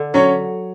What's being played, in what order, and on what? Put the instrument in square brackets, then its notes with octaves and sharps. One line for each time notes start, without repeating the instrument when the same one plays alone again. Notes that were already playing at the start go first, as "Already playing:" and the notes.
Already playing: [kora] D3
[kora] F#3 [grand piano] C#4 C#5